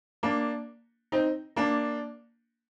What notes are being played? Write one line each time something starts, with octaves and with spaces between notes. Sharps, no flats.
A#3 D4
C4 D#4
A#3 D4